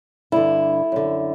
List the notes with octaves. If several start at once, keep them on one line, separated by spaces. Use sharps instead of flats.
G2 D3 E4
F#2 D3